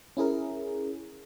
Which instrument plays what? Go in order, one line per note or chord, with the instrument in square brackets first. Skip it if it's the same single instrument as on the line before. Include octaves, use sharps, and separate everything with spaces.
[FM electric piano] C#4 E4 G#4 A#4